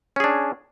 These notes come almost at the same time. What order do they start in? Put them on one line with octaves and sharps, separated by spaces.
C#4 G#4 D4